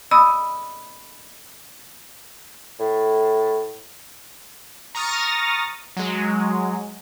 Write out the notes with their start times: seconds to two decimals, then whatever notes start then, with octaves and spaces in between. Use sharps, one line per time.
0.11 D#5 B5 D#6 E6
2.79 A2
4.95 A#5 C#6 D#6 F6 A6 A#6
5.97 F#3 G#3